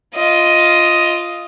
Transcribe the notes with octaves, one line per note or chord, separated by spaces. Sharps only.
F4 D#5